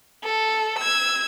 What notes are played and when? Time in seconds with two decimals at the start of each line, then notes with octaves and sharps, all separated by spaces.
0.24 A4
0.79 E6 G#6